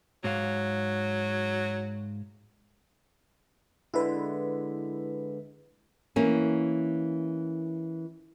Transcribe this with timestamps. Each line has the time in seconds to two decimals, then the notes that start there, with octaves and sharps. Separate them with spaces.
0.24 G#2 F#3 F5
3.94 D3 G#3 E4 B4
6.16 E3 A#3 C#4